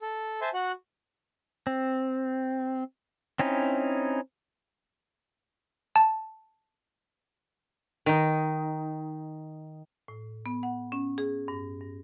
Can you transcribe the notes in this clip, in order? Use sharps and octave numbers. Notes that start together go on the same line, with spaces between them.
A4
C5 E5 G#5 A5 C6
F#4 F#5 F#6
C4
C4 C#4 D#4 E4
A5
D#3 D#4
A2
B3
F#5
C#4
G#4
G2
G2